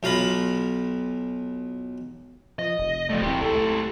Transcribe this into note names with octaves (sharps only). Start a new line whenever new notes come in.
B1 F4 F5 A#5 B5
F3 D#5
F1
F3 G3 A3
D1 C4 E4 G4
C#2 A4
A3